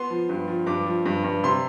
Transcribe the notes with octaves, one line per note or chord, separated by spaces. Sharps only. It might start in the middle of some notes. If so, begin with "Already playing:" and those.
Already playing: B3 C6
F3
G2
F3
G2 D6
F3
G2
G2
C3 C6